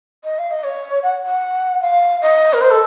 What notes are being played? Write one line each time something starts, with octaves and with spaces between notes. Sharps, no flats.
D#5
F5
D#5
C#5
F#5
F#5
F5
D#5
A#4
C5
A4